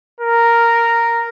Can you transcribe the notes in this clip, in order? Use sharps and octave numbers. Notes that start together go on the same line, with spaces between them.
A#4